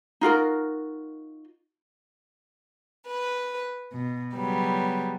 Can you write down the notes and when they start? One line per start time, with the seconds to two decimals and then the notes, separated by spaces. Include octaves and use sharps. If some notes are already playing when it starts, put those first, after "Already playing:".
0.21 D#4 F4 F#4 A#4
3.08 B4
3.93 B2
4.35 C#3 F#3 G3 B3